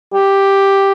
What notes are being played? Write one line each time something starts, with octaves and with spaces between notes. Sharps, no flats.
G4